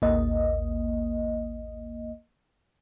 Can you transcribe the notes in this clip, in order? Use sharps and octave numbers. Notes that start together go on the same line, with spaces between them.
A1 D#2 A#3 D#5